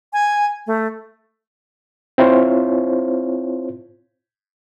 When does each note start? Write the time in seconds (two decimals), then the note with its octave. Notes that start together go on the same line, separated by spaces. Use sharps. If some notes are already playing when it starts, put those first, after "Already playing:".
0.13 G#5
0.67 A3
2.18 C4 E4 F4 C5 C#5